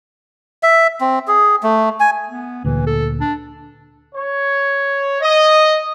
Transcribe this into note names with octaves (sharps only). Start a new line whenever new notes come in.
E5
C4
G#4
A3
G#5
B3
D2 A#2 E3
A4
D4
C#5
D#5